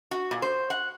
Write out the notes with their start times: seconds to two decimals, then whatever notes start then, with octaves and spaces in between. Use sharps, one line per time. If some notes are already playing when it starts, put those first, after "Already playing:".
0.11 F#4
0.31 A#2
0.42 C5
0.70 F#5